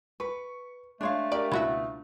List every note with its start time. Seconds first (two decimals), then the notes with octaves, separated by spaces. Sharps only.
0.20 B4 C#6
1.01 G#3 A3 D4 C#5 F5 C6
1.32 G4 A#4 D5 E5
1.52 C#2 B2 E4 F#4 E5